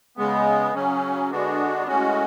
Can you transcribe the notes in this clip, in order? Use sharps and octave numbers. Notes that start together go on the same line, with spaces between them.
C#3 G#3 B3
C#3 F#3 C#4
D3 G#3 B3 D4 F#4
A2 G#3 C#4 F#4